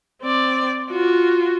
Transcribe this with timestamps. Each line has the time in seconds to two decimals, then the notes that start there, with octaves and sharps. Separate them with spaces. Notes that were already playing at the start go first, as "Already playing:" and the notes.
0.22 C4 D5
0.90 F4 F#4